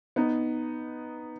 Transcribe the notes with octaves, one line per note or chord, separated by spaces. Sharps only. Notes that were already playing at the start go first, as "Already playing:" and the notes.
B3 D#4